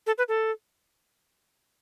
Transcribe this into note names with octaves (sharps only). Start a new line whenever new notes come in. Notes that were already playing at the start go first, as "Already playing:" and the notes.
A4
B4
A4